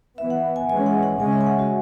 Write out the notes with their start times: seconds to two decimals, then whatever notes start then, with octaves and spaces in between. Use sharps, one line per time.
0.17 E3 B3 E5
0.30 F#5
0.56 G#5
0.69 E3 G#3 C#4 G#5
0.86 F#5
1.03 F#5
1.20 C#3 G#3 C#4 G#5
1.33 E5
1.41 G#5
1.46 F#5
1.59 F#4